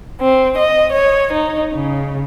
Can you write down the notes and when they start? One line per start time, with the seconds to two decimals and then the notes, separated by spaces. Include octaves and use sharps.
0.20 C4
0.57 D#5
0.90 C#5
1.31 D#4
1.72 C#3